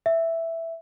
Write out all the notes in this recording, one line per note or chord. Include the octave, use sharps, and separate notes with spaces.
E5